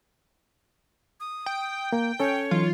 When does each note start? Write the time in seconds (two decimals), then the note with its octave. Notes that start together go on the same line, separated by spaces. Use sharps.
1.20 D#6
1.46 G5
1.92 A#3
2.20 C#4 A4 C#5
2.51 E3 F#3 D#4 F4